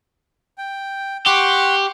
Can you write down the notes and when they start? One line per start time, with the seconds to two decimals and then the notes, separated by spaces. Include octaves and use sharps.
0.58 G5
1.26 G4 F#5 C6 C#6